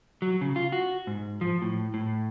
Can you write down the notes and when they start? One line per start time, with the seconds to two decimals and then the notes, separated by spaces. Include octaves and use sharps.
0.22 F#3
0.41 C#3
0.56 F4
0.72 F#4
1.07 G#2
1.41 F3
1.62 A2
1.94 A2